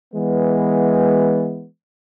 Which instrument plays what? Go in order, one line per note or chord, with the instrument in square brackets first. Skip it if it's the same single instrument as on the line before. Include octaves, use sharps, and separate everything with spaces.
[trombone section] E3 G#3 B3